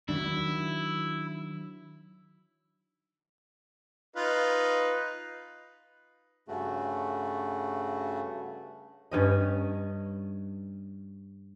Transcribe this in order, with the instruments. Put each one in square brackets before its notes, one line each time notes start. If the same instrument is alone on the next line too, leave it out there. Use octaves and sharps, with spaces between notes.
[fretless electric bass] D#3 F#3 D4 [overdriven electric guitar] E4
[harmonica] D#4 F4 B4
[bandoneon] G2 C#3 A3 F#4
[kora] G2 C#4 D#5